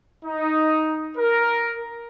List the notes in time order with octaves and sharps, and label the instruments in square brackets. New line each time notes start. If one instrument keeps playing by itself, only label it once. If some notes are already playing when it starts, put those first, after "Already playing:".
[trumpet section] D#4
A#4